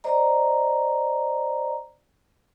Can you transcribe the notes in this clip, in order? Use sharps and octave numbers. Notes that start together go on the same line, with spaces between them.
C5 D5 D#5 A#5